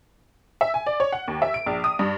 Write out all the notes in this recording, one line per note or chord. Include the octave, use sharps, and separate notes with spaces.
E5
G#5
D5
C#5
F#5
D#2
E5
D7
A#1
D#6
G2